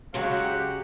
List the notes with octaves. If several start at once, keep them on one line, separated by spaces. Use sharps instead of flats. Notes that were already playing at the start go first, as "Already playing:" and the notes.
C#3 F#3 G#3 G4 F#5